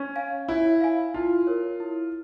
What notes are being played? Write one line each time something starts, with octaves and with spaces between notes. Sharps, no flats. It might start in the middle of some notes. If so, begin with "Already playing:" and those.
Already playing: C#4
F5 G#5
E4 C#5
F5 G#5
E4 F4
A#4 C#5
E4